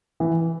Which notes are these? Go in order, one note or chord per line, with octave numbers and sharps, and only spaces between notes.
E3